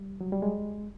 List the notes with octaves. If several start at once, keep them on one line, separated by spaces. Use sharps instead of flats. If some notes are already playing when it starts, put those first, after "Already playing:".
Already playing: G3
F#3
G3
G#3